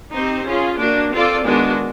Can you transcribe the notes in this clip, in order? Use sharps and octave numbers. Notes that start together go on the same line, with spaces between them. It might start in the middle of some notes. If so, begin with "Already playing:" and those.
C4 D#4 G4 C5
C#4 F4 G#4
A#3 D4 F#4
C4 F4 A4 D5
D#3 G#3 B3 D4 F#4